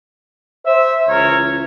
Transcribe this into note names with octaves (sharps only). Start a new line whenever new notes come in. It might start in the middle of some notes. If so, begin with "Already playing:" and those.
C5 E5
C#2 C#3 E3 A#4 C#5